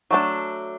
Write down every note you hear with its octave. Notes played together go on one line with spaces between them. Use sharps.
F#3 A3 D4